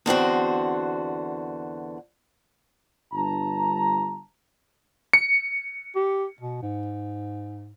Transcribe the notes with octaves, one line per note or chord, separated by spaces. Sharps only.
E2 D3 C4 F#4
G1 G2 A5 A#5
C#7
G4
B2
G#2